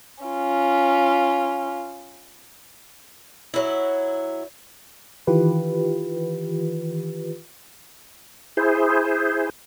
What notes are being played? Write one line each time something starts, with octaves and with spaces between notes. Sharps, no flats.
C#4 F4
F#3 E4
D#3 E3 F4 G4 B4
E4 G#4 C5